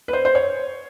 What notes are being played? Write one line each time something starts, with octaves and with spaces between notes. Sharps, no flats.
B4
C5
C5
C#5